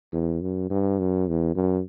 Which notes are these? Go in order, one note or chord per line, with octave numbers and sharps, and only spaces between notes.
E2
F#2
G2
F#2
E2
F#2